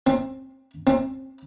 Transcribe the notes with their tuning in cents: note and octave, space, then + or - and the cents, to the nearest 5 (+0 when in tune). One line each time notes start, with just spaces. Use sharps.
C4 +20
C4 +25